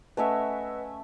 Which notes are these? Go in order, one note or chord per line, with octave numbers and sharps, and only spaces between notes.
A3 C#4 B4 D#5 E5 F#5